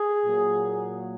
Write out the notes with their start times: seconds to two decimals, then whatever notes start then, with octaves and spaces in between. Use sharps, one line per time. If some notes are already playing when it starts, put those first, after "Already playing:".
Already playing: G#4
0.24 A#2 F#3 A#3